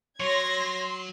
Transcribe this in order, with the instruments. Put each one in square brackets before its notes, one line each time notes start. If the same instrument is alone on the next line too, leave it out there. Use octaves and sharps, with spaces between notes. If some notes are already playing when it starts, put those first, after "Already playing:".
[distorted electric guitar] F#3 [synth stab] C#5 [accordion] C6 [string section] G#6 A#6